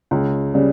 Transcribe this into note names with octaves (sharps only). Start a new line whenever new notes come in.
C#2
C#3 G3